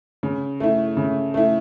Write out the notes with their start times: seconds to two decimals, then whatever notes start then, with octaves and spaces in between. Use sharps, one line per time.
0.23 C#3
0.60 A3 E4
0.97 C#3
1.34 A3 E4